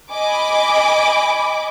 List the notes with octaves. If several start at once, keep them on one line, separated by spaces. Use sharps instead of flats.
D#5 G#5 B5 D6